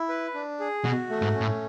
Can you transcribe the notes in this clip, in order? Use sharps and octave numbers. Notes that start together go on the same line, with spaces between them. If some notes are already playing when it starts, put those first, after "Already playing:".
Already playing: E4
B4
D4
G#4
B2 F#4
A3
G#2
C#4
A2